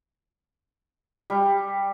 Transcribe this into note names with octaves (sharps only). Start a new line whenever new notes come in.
G3